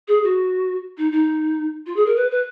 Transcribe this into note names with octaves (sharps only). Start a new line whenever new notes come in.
G#4
F#4
D#4
D#4
F4
G#4
A#4
B4
B4